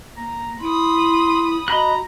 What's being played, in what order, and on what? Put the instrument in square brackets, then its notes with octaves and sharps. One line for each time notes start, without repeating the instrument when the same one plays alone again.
[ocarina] A#3 [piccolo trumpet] A#5
[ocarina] E4 [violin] B5 D#6 [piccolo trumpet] C6
[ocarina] F#4 [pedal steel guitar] D#5 B5 F#6 [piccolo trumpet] A#5